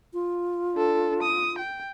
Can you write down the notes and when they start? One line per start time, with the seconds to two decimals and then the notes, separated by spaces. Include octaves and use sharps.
0.13 F4
0.74 D4 A4
1.22 D#6
1.59 G5